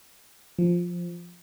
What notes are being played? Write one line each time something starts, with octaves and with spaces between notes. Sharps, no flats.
F3